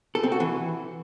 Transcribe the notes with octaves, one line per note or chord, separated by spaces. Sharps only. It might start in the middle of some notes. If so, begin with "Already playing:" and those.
A4
C4
F#4
E3